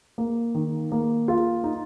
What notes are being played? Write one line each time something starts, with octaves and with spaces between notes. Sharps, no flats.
A#3
D#3
A#3
F4
D#4